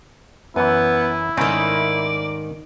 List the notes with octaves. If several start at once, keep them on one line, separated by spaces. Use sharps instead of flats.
F#2 E3 B3 E4
G#2 D#3 A3 C4 C#4 D5